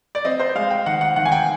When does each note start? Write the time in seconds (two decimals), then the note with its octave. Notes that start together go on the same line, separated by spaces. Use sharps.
0.15 D5
0.25 C4 D#5
0.40 C5
0.55 G#3 F5
0.70 G5
0.86 D#3 F#5
1.01 F#5
1.16 D#3 F#5
1.25 G#5
1.32 G5